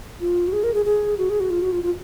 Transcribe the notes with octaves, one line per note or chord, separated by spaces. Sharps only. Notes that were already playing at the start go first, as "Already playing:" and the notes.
F4
F#4
G#4
A#4
G#4
G#4
F#4
G#4
F#4
F4
F#4
F4
F4